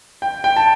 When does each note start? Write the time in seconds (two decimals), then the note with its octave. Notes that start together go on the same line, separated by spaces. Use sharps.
0.22 G5
0.44 G5
0.56 A5